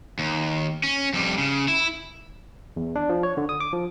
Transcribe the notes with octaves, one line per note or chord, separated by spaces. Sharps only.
D#2
C#4
F2 G3
C#3
E4
E2
D4
F3
C#5
D3
D#6
D6
F3